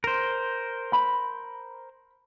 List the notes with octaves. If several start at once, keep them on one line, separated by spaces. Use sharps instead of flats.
A#4 C5
B5